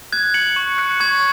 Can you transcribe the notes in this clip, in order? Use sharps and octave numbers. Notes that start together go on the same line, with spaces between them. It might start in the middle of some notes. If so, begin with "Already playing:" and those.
F#6 G#6
C#7 F#7
C#6
F#6 C#7
C#6 G#6